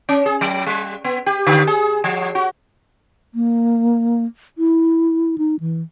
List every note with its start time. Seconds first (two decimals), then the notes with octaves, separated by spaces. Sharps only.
0.09 C#4
0.26 G#4
0.41 F#3
0.67 G3
1.04 B3
1.26 G4
1.47 D3
1.67 G#4
2.04 F3
2.35 F#4
3.34 A#3
4.58 E4
5.38 D#4
5.60 E3